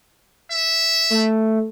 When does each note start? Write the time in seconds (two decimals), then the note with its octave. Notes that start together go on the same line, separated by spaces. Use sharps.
0.51 E5
1.10 A3